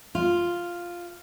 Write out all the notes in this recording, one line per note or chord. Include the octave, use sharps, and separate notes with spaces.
F4